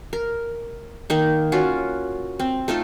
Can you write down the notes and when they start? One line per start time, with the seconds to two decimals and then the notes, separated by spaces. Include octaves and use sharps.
0.13 A#4
1.10 D#3 A#3 D#4
1.52 C#4 F4 F#4
2.39 C4
2.68 A3 D#4 F4 A4